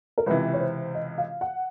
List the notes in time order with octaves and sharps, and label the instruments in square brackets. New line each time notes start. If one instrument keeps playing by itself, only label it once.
[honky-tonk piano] A#4
[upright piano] C#2 C3 E3 [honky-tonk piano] B4
[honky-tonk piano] C#5
C5
D#5
F5
F#5